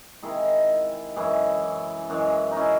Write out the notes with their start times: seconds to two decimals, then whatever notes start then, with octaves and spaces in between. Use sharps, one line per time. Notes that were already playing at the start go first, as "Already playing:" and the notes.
0.23 C3 D#3 G#3 E4 G#4
1.16 F#2 C#3 E3 G#3 E4 G#4
2.10 F#2 E3 G#3
2.51 D#4
2.57 C#4 E4